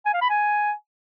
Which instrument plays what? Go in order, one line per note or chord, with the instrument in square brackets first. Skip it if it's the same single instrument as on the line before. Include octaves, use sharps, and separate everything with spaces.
[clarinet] G#5
F5
B5
G#5